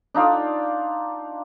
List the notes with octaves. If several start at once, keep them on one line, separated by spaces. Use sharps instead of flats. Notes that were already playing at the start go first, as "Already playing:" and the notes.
D4 D#4 F4 D5